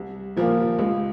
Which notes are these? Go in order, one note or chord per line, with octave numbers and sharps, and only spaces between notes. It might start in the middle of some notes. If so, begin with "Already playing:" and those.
Already playing: C2
A#2 F3 A#3 F4
C#2